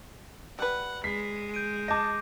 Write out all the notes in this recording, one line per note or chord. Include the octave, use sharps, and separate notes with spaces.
G3 B4 F#5
G#3 B6 C7
G6 D7 D#7
D#5 A5 D6 G6 A#6